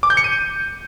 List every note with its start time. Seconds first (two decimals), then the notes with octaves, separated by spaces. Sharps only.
0.03 D6
0.10 G6
0.17 C#7
0.24 D#7